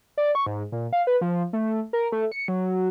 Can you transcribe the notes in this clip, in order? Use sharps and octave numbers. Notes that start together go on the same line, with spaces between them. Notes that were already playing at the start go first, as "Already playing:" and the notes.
D5
C#6
G#2
A#2
F5
B4
F3
A3
A#4
A3
C#7
F#3